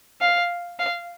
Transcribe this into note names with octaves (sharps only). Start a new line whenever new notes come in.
F5
F5